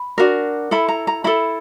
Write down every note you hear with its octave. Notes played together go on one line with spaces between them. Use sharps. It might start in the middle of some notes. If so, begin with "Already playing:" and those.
Already playing: B5
D4 F#4 A#4
E4 A4 B5
A#5
A#5
E4 A4 B5